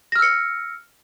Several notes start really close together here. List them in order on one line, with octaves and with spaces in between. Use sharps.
A#6 F6 E6 C#7